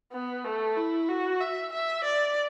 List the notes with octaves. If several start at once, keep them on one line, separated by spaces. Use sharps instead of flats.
B3
A3
E4
F#4
E5
E5
D5